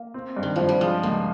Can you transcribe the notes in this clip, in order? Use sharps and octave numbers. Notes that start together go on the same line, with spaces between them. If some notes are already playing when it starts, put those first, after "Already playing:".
Already playing: A#3
C4
G2
D#3
G2 F3
G3
F3 G#3
C#2 A#3